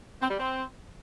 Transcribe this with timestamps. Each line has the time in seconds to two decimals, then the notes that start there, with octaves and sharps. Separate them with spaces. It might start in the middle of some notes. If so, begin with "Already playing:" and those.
0.22 C4
0.30 G3
0.39 C4